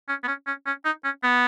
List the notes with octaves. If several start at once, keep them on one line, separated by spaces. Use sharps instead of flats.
C#4
B3
C#4
C#4
C#4
D#4
C#4
B3